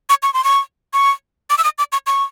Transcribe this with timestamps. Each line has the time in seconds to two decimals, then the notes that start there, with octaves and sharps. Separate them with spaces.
0.09 C#6
0.23 C#6
0.34 C6
0.44 C#6
0.93 C#6
1.50 D6
1.58 E6
1.64 D#6
1.78 D6
1.92 C#6
2.07 C#6